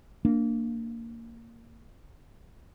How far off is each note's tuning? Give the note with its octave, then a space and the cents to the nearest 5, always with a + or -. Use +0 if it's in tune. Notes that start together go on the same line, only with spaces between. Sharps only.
A#3 -20 D4 +0